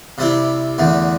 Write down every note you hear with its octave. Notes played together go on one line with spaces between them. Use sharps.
C3 G3 C4 E4
E2 D3 A3